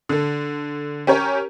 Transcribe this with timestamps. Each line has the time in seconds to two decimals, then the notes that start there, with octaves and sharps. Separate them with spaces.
0.09 D3 A4
1.07 C#4 G4 A#4 C#5